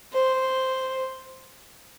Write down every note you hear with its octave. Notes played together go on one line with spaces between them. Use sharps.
C5